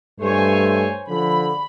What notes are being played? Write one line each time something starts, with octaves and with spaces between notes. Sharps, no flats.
G2 A3 C5 C#5 G#5
D3 F3 B5